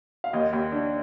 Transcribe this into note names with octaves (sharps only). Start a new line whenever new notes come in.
F5
D#2 D#5
D#2
D4